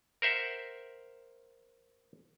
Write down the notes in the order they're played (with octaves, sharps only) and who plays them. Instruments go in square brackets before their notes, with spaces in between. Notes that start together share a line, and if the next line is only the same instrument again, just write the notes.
[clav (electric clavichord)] A#4 C5 E5 F#5